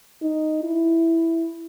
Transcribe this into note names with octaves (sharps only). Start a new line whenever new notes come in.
D#4
E4